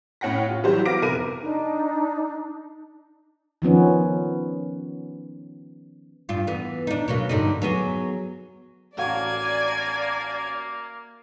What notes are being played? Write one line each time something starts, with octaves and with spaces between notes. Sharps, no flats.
A2 C#4 F#5 G5 A#6
F4
E3 F#3 G3 F#4 C5
B3 F5 D6 A#6 D7
F1 A#4 B4 D#7
D4 D#4
D#3 F3 B3 C#4
G2 F4
E3 B3
D4 D#4
B2 F#3 A#3
G2 D3 D#4
F#3 B3 G#4
A1 A#3 F#4 D5 F5 G#5